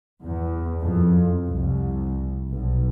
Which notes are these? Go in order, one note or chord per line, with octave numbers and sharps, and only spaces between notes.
E2
F2
C2
B1